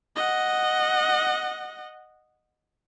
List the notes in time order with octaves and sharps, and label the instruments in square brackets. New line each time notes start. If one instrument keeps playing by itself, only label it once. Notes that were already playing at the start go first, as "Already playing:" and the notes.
[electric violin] D#5 F#5